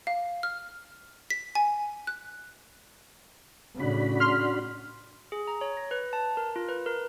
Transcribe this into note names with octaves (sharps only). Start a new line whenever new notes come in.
F5
F6
B6
G#5
F#6
A2 C#3 D4 F#4 B5
C6 F6
G#4
A#5
C#5
A#6
B4
A5
A#4
F4
B4
A#4